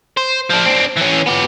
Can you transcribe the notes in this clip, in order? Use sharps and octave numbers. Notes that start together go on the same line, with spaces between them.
C5
F3 D4
C4 D4
E3 C#4
B3 G4